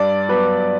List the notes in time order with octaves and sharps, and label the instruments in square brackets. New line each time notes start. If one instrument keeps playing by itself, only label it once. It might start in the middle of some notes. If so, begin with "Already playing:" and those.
Already playing: [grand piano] G2 D5
F#3 B3 B4